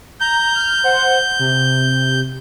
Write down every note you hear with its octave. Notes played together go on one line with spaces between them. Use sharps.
A#5 G6
F6
C5 F#5
C3